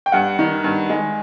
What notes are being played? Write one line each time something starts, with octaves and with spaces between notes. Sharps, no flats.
G5
G2 F#5
D#3
G2
G#3